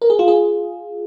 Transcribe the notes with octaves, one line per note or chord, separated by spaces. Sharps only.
A#4
G#4
F4
G#4